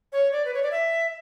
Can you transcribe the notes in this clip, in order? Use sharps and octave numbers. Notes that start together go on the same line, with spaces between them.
C#5
D5
B4
C#5
D5
E5